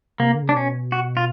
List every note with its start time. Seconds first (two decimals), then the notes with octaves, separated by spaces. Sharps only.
0.19 C3 A#3
0.35 D3
0.42 C#3
0.49 C3 D4
0.56 B2 C#4
0.92 F#4
1.17 F4